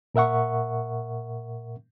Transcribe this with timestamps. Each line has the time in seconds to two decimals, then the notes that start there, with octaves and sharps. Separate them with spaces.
0.15 A#2 A#4 E5 F#5 C#6